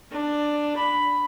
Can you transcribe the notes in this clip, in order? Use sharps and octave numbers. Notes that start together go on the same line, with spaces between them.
D4
B5